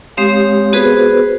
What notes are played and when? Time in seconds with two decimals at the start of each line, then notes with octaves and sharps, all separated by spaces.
0.17 G#3 C4 G4 C#5 F5 D#6
0.73 B3 F#4 G#4 B4 C5